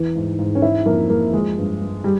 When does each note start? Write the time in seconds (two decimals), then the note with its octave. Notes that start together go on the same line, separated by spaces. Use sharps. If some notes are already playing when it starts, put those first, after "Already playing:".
Already playing: E2 E3
0.15 G#2
0.39 G#2
0.55 C#4
0.62 E3 E4
0.86 F2 A#3
1.10 F2 A#3
1.33 F3 G#3
1.57 G2
1.80 G2
2.04 G3